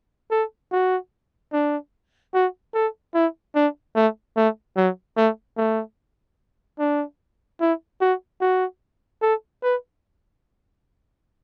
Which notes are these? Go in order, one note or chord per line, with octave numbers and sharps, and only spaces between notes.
A4
F#4
D4
F#4
A4
E4
D4
A3
A3
F#3
A3
A3
D4
E4
F#4
F#4
A4
B4